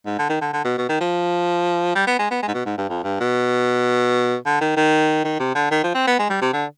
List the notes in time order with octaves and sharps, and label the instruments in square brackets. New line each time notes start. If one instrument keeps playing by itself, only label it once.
[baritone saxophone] G#2
D3
D#3
D3
D3
B2
B2
D#3
F3
G3
B3
G#3
B3
G#3
G#2
B2
G#2
G2
F2
G2
B2
D3
D#3
D#3
D#3
C3
D3
D#3
F3
C4
B3
G#3
G3
C3
D3